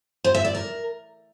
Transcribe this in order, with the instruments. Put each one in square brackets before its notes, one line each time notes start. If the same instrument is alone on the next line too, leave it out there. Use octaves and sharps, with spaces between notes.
[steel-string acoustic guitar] C5
E5
D5
A#4